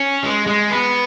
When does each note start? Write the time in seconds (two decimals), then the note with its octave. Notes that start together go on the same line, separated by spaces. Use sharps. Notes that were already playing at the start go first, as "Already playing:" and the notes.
Already playing: C#4
0.23 G#3
0.47 G#3
0.70 B3